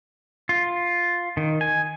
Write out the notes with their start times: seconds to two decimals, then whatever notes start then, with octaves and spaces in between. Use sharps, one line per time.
0.49 F4
1.37 D#3
1.61 G#5